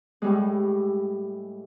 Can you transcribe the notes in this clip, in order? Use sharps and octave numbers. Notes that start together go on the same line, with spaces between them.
A2 G3 G#3